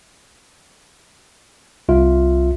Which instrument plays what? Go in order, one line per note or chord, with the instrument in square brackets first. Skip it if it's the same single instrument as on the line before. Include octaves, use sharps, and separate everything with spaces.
[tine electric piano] C2 F4 E5